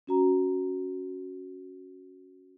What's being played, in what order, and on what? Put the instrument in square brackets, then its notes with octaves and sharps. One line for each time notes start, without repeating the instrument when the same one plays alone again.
[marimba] C#4 F#4 A#5